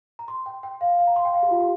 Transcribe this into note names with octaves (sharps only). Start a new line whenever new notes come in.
A#5
C6
G5
G5
F5
F5
A#5
C6
G5
F5
G4
F4
G4